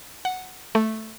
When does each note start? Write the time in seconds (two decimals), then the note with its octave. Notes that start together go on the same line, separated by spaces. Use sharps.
0.25 F#5
0.75 A3